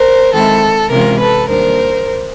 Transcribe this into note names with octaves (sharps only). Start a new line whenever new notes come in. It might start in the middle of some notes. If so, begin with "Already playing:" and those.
Already playing: A#4 C5
D#3 G#3 C4 E4 A4
C3 E3 G#3 C#4 F4 A#4
A4 B4
D#2 D#3 G3 A#3 D4 A#4 C5